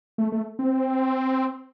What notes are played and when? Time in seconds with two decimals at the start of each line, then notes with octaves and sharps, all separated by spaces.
0.18 A3
0.32 A3
0.59 C4